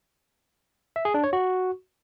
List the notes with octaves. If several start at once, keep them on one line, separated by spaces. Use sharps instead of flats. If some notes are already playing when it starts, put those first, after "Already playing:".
E5
G#4
D4
C#5
F#4